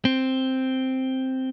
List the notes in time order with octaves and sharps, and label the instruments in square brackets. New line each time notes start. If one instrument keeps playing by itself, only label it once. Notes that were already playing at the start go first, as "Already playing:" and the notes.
[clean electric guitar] C4